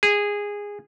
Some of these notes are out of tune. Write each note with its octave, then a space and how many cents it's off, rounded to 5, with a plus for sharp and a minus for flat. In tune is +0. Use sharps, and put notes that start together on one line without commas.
G#4 -15